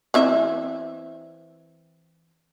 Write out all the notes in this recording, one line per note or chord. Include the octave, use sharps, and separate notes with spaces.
E3 C4 E5